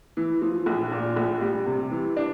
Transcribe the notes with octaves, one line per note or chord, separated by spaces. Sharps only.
E3
F3
A#1
A#2
A#1
G3
C3
E3
D4